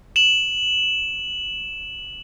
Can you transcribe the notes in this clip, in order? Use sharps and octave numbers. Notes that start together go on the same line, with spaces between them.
E7 F#7